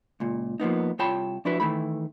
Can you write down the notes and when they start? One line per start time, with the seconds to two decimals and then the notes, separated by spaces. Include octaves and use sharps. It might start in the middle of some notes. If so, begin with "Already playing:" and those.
0.20 C#2 A#2
0.60 F3 A#3 B3 D#4
0.99 C2 F4 C#5 G5 A5 B5
1.45 F3 D4 E4 F#4 B4
1.60 D#3 E3 A3 B5